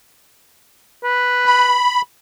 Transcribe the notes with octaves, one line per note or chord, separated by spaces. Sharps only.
B4
B5